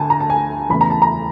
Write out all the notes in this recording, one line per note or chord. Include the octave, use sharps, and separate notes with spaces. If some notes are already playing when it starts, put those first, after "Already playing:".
Already playing: D2 D3 G#5 A5
A#5
A5
G#5
E2 C#3 E3 A3 B5
A#5
A5
A#5